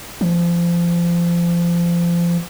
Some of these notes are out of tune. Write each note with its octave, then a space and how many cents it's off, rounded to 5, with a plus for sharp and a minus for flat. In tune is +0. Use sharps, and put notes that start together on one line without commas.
F3 -25